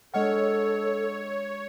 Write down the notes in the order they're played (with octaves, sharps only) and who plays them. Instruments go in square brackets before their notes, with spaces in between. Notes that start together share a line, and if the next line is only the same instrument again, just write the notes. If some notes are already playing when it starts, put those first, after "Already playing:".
[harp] G#3 D4 F6 [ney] A4 [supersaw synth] C#5 [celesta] D#5 F#5